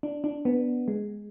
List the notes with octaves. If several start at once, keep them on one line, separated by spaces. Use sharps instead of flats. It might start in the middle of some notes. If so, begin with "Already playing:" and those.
D4
D4
B3
G#3